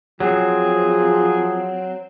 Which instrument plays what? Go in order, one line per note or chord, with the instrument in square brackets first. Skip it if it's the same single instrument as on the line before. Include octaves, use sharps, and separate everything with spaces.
[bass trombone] F3 [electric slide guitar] F#3 C4 [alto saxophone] G#4